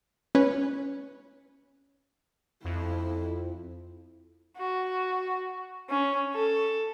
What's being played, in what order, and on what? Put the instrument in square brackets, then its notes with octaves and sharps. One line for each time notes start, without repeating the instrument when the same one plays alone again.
[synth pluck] C#4 B4 C#5
[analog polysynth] F2 [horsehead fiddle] E4
[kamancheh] F#4
C#4
A4